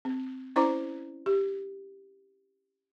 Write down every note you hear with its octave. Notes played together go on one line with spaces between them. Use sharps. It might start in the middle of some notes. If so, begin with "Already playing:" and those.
C4
C#4 E4 C5 D5 A#5 D6
G4